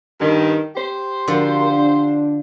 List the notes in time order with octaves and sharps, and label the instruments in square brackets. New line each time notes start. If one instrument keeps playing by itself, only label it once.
[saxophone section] G2 D#3
G4 C5
[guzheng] D3 F3 [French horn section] D4 F#4 A#4
[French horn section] D4